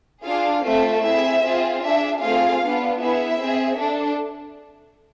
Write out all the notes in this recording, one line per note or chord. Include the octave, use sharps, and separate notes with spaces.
D4 F4 G#4 F5
A3 C4 F4 A4 E5
C4 E4 G#4 E5
C4 F4 G#4
D4 G#4 E5
A3 C4 F4 G#4 F5
B3 D4 F4
B3 E4 G#4 E5
C4 G#4
D4 A4